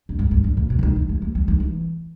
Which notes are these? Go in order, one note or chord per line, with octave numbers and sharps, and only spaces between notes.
G2
G#2
G2
G2
A#2
B2
E3
D#3
E3
G#3
A#3
G3
D#3
E3